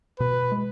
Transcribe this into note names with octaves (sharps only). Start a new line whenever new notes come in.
B2 B4
G#3